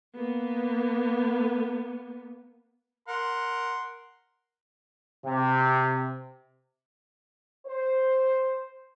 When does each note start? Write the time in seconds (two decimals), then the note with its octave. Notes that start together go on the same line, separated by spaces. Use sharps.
0.15 A#3 B3
3.08 A#4 F#5 C6
5.25 C3
7.66 C5